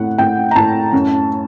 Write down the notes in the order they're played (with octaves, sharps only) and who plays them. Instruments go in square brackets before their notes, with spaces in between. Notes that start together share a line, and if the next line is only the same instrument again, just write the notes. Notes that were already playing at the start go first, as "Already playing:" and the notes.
Already playing: [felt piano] A2 F#5
A2 G5
A#5
A2 A5
F#2